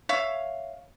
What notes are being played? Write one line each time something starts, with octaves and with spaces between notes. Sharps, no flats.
C#5 E5 F5